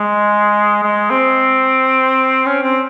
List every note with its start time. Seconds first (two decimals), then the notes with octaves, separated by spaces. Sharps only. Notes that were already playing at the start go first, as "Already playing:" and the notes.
Already playing: G#3
0.83 G#3
1.10 C4
2.46 C#4
2.63 C4